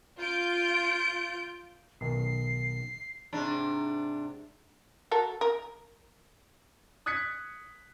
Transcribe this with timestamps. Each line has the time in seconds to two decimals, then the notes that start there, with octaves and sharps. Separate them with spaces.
0.19 F4 G6 D7
2.01 B1 D#3 C7
3.33 G#2 C3 D4
5.11 F#4 A4 A#4
5.41 A#4
7.06 D#6 F#6 G#6 B6 C#7